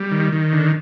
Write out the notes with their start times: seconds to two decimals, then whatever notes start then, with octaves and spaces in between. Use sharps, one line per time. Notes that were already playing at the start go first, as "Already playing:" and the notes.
Already playing: G3
0.11 D#3
0.32 D#3
0.53 D3